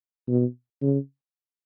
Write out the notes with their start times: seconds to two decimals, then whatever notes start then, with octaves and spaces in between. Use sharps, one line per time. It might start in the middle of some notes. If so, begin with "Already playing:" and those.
0.28 B2
0.82 C#3